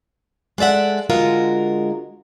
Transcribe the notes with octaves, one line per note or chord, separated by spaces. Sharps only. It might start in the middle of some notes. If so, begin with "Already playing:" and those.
G#3 A4 D5 E5 F#5
D3 G#3 F4 F#4 A#4